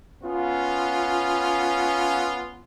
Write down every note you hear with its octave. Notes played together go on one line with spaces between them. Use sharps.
B3 C#4 F4